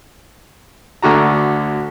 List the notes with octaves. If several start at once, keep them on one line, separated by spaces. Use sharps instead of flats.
D2 D3 F#4 A#5